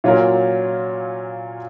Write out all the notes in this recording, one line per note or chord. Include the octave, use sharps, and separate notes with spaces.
A#2 F#3 C#4 F4 A#4